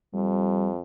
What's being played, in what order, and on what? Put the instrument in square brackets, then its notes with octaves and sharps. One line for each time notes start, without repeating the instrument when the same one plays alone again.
[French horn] F2 [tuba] G3